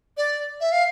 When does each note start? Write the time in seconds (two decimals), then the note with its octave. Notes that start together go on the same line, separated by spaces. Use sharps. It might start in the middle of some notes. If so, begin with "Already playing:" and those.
0.17 D5
0.61 E5
0.72 F5